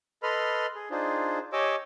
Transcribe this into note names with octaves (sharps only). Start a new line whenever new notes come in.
A4 B4 D#5 B5 C6 F6
G#4
D4 D#4 F4 G#4 C5
G4 C#5 D#5 G#5 D6 E6